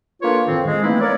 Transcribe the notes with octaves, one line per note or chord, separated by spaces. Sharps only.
A#3 D4 F4 A4 B4 C#5
F2 A2 D#3 C4
G#3
E3 A3 A#3 C4 D#4 E4
A#4 C#5 D5